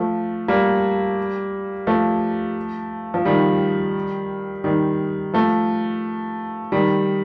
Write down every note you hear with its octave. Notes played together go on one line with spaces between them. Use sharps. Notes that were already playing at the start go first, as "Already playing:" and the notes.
Already playing: F3 A3
G3 A#3
F3 A3
F3
D#3 G3
D#3 G3
F3 A3
D#3 G3